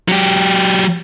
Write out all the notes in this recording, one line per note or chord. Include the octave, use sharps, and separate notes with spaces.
F#3 G4